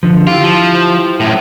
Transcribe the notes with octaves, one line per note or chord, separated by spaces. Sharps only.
D3 F3
E4 F4 G4
F3
F#2 A2